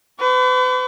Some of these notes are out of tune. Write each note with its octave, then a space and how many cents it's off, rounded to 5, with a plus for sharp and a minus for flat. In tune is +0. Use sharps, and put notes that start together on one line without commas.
B4 +40 C#6 +45